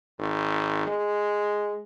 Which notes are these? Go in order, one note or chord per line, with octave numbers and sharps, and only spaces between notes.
G#1
G#3